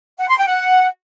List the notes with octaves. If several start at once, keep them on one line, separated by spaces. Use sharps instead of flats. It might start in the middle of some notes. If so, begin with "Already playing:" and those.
F#5
C6
G5
F#5